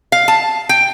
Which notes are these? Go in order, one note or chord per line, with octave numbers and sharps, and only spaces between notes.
F5
A5
G5